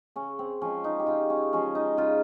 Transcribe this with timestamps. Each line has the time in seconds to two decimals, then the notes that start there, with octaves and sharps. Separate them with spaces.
0.16 C#3 C#4
0.39 C4
0.61 F3 G#3 C#4
0.84 D#4
0.99 G4
1.06 C#3 F4
1.30 C#4
1.52 F3 G#3 C#4
1.75 D#4
1.97 C#3 F4